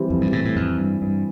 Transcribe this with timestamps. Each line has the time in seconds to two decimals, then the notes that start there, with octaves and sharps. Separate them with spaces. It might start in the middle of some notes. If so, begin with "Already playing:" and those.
Already playing: E3 G3 C4
0.10 F2
0.21 G2
0.32 A2
0.45 A2
0.56 F2
0.78 G2
1.02 G2